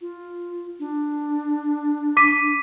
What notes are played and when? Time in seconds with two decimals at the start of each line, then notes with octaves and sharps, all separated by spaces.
0.01 F4
0.79 D4
2.17 D6 B6 D#7